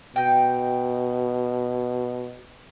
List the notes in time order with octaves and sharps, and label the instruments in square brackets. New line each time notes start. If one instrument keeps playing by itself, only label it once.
[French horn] B2 [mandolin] D#4 G5